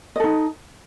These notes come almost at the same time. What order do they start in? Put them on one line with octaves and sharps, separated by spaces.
D#5 A4 D#4